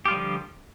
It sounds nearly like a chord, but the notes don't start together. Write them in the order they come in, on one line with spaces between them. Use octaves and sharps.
G4 F4 G3 F3 D3